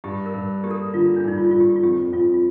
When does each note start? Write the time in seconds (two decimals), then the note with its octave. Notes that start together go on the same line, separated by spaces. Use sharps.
0.04 G2 G4
0.26 A#4
0.34 G2
0.63 A#3 G4
0.71 A4
0.94 D3 F4
1.16 D4
1.24 G2 D#4
1.38 F4
1.51 G2 F4
1.60 G4
1.76 F4
1.83 F2 G4
2.12 F2 F4
2.34 F4